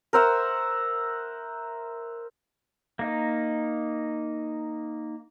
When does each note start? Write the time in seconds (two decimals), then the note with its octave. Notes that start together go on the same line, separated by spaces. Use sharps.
0.13 A#4 C5 E5 F#5
2.99 A#3 D#4